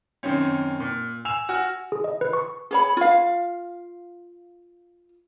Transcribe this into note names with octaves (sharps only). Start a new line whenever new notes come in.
F#2 D#3 C4 C#4
A#2
G#5 E6 E7 F7
F#4 G#5 E6 F6
G#4
D#5
B4
C#6
G#4 C#5 B5
F4 F5